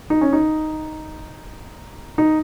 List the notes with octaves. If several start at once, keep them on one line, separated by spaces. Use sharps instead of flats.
D#4
C#4
D#4
D#4